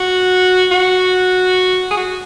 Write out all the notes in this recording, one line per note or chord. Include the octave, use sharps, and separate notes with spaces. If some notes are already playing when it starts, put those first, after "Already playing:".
Already playing: F#4
F#4
G#4
F#4